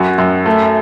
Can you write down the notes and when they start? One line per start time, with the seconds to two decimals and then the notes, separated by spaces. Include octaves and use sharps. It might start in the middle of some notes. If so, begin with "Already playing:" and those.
Already playing: F#2 F#4
0.18 F#2
0.46 A3